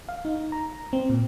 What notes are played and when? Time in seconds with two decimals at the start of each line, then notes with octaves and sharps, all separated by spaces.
0.09 F5
0.25 D#4
0.52 A#5
0.93 C4
1.09 A#2